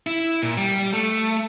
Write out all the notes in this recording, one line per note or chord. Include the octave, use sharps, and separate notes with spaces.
E4
A#2
G3
A3